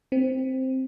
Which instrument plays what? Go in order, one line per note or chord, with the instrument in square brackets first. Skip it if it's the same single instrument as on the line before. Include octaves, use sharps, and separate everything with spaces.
[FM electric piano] C4